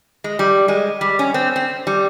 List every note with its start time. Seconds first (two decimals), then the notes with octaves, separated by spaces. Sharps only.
0.24 G#3
0.39 G3
0.68 G#3
1.01 G3
1.19 C#4
1.34 C4
1.56 C4
1.87 G3